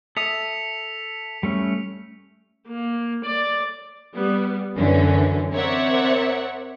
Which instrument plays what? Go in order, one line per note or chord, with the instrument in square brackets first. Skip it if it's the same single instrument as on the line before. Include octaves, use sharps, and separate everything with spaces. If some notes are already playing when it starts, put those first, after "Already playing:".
[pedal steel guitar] A4 E5 D#6 [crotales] B6 C#7 F7
[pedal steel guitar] G3 A3 C#4
[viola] A#3
D5
[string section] G3 B3
F#2 D3 E3 C#4
C4 A#4 C#5 D5 E5 F#5